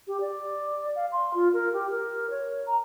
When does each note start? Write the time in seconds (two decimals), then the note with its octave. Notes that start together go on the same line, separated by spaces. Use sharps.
0.07 G4
0.21 D5
0.96 F5
1.12 C6
1.34 F4
1.53 A#4
1.73 G4
1.91 A#4
2.30 C#5
2.68 A#5